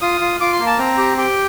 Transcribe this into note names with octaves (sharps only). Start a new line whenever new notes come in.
F4 D#6
F4
F4 D6
C6
A#3
A5
C4 A#5
G4
G4 G5